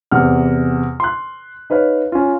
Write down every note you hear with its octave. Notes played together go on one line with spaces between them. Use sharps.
E2 C3 F#5 F6
C6 F#6
D#4 B4 C#5 F5
C#4 F4